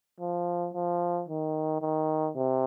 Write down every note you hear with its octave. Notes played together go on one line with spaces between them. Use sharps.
F3
F3
D#3
D#3
C3